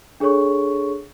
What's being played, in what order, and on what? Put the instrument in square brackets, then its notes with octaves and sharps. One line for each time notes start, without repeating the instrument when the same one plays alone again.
[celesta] D4 G#4 A4 C#5 C#6